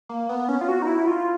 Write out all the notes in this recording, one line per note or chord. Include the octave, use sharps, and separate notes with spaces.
A#3
B3
C#4
F4
F#4
D#4
E4
F4